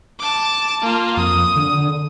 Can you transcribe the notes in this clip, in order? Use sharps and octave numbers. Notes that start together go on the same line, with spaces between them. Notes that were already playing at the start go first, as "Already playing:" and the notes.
A5 D6
A#3 F4
F2 D#6
D3